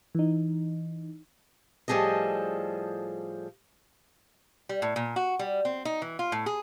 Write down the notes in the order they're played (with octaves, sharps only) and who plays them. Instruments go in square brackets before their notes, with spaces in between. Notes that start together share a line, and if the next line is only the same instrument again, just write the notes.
[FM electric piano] E3 D#4
[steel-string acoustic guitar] A2 F3 G3 G#4 A4 D#5
[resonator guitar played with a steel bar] G3
A2
A#2
F#4
G3
C4
D#4
E3
F4
A2
G#4